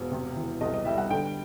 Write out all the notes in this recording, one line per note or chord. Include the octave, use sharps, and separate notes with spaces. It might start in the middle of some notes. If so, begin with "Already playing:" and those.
Already playing: E1
C3
E3
C2 D#5
D#5
G3 E5
F#5
D3 G5